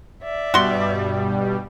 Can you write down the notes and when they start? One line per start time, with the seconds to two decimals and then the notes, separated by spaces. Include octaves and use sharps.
0.23 D5 E5
0.54 G2 B2 G3 F#4 C6